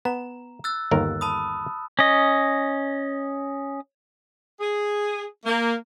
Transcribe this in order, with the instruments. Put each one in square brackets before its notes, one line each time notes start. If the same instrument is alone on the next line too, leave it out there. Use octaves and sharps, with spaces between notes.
[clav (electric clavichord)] B3 [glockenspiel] A#5
[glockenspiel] E6 F#6 A6
[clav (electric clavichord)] G1 D#2 A#4
[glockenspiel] A5 B5 D#6
[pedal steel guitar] C#4 D#5
[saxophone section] G#4
A#3